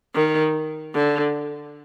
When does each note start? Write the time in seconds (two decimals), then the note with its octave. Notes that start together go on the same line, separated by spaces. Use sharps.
0.15 D#3
0.95 D3